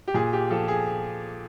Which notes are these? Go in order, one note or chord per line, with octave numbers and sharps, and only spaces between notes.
G4
A#2 G#4
G4
F3 A4
G#4